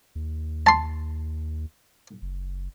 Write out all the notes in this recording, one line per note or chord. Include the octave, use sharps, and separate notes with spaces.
D#2
A5 C6
F#1